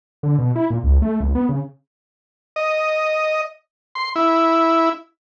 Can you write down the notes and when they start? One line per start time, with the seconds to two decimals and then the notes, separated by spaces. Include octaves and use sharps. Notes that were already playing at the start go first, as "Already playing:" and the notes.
0.23 D3
0.38 B2
0.56 E4
0.70 A#2
0.84 C#2
1.02 A3
1.21 C#2
1.35 B3
1.49 C#3
2.56 D#5
3.95 C6
4.16 E4